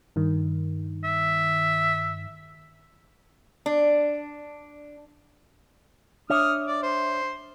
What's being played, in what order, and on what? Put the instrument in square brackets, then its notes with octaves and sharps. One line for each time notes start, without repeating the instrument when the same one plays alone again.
[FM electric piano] G2 D#3
[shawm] E5
[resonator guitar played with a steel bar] D4
[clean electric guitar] D4 C#5 E5 [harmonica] D#6 F6
[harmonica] D5
C5